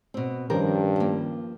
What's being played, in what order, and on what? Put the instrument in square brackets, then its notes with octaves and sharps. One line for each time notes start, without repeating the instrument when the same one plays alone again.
[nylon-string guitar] B2 C4
[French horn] G2 [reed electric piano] D#3 C#4 [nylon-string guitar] F3 G4 A#4
[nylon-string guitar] F3 A#3